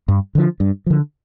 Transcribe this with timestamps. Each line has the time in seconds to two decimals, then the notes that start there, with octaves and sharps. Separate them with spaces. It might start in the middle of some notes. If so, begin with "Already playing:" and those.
0.08 G2
0.35 D3 F3
0.60 G2
0.86 D3 F3